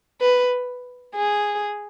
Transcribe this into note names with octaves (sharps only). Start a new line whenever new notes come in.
B4
G#4